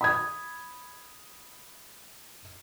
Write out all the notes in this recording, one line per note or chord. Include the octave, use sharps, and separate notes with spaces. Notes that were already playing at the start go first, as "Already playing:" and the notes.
B5 D#6 G#6